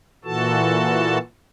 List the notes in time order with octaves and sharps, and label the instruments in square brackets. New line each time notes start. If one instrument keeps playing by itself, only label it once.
[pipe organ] A#2 E3 F#4 A4 A5